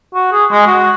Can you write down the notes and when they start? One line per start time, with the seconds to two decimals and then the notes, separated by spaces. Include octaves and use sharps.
0.15 F#4
0.32 G#4
0.51 G#3
0.67 F#4